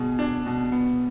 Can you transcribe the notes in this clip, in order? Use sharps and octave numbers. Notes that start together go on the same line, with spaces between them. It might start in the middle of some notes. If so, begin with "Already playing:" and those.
Already playing: B2 G#4
D4
B2
B3